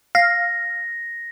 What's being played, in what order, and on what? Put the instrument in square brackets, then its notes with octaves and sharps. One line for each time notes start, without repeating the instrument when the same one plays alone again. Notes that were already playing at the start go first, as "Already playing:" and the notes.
[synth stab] F5 [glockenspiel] A#6